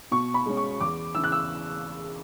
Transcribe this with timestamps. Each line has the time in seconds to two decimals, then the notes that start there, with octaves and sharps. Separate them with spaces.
0.11 B2 C#6
0.34 B5
0.46 G#3 C#4
0.57 C#6
0.80 E2 D6
1.15 C#3 E3 E6
1.24 F#6
1.32 E6